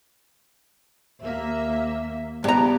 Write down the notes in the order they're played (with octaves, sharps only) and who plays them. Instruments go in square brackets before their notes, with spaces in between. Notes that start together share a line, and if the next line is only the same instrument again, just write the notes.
[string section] D#2 A#3 E5
[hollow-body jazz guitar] G2 A#5 [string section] B3 G4